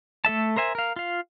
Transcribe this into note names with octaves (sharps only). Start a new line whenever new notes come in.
A3 A4 E5 A5
A#4 C5 E5 G#5
A#4 F5
F4 F5